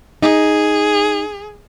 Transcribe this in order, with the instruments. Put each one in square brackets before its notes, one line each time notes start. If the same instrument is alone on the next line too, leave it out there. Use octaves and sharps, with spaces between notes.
[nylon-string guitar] D#4 [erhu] G#4